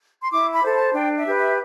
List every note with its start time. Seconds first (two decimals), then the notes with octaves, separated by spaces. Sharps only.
0.22 C6
0.31 E4 D6
0.53 B5
0.63 A4 C5
0.73 A5
0.95 D4 G5
1.16 E5
1.27 G4 B4
1.38 E5